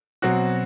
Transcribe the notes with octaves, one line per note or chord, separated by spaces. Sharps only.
B2 F#3 C4 F#4